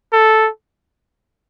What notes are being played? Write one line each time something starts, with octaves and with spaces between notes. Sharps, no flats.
A4